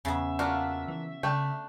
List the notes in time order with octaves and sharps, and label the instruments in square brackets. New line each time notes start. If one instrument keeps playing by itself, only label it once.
[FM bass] E2 [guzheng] C#3 B3 [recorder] E5
[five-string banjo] A#3 D4 F4 [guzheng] F#4
[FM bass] E3
[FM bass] C#3 [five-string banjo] A3 D4 G5